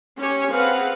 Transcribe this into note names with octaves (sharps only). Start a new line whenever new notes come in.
C#4 G4 C#5
C4 G#4 B4 F5 F#5